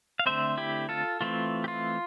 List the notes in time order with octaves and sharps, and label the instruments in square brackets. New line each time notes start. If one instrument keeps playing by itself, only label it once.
[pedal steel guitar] F5
D3 A3 C4 C5 E5
E4 G4
F4 A4
E3 A3 C4 F4
G4
F4